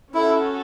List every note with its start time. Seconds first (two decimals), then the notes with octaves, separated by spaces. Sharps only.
0.14 C#4 E4 F#4 A4